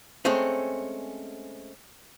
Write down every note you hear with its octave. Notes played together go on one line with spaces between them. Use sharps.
G#3 A3 C4 C#4